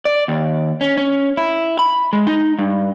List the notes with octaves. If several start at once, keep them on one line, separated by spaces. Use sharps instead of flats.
D5
D#2
C#4
C#4
E4
B5
G#3
D#4
G2